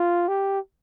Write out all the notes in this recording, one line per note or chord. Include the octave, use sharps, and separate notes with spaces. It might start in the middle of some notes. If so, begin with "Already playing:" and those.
Already playing: F4
G4